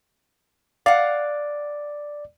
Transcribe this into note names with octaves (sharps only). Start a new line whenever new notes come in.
D5 F5 F#5